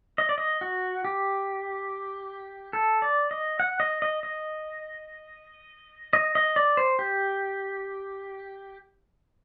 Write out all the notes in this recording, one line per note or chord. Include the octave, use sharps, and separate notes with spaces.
D#5
D5
D#5
F#4
G4
A4
D5
D#5
F#5
D#5
D#5
D#5
D#5
D#5
D5
C5
G4